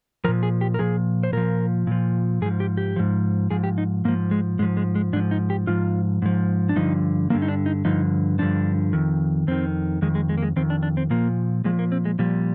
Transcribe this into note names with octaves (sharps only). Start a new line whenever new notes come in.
A#2 F3 A#4
G#4
G4
A#4
A#2 F3 G#4
C5
A#2 F3 A#4
A#2 F3
G#2 F3 G#4
G4
G4
G#2 F3
G#2 F3 G#4
G4
D#4
G#2 F3 A#3
G#3
G#2 F3 G#3
G#3
G#3
G#2 F3 D4
D#4
G4
G#2 F3 F4
G#2 F3
D4
G2 D3 F3 D#4
G2 D3 F3 A#3
D#4
D4
D#4
G2 D3 F3 D#4
G2 D3 F3 D4
F2 D#3
F2 D#3 C4
F2 D#3 G#3
G#3
G#3
A#3
G#3
F2 D#3 C4
D4
D4
C4
A#2 F3 A#3
A#2 F3 G#3
A#3
C4
G#3
A#2 F3 G3